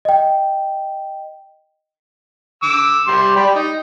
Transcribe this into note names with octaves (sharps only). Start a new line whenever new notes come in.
D#5 G5
D6 E6
G3 C6
G4 D5 B5
D#4